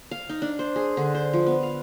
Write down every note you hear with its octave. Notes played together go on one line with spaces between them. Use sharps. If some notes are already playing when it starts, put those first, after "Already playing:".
F5
D#4
D4
C5
G#4
D3
C5
F3
B3
F5